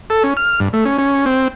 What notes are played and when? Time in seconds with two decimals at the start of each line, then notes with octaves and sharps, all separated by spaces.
0.10 A4
0.24 C#4
0.37 F6
0.60 G2
0.73 A3
0.85 C#4
0.98 C#4
1.26 C4